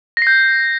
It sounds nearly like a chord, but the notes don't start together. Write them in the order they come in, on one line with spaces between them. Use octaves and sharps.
A#6 C7 G6